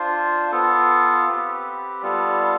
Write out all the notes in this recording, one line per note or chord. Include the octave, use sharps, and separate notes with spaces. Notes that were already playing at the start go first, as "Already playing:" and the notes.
Already playing: D4 F4 C5
B3 F4 A4
C4 G4 B4
G3 B3 F4 A4